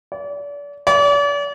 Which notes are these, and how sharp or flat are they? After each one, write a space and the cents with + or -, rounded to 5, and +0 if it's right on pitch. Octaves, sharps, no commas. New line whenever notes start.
D5 -35
D5 -40